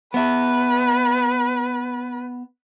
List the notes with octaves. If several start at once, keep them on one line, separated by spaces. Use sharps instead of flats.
B3 B4 E5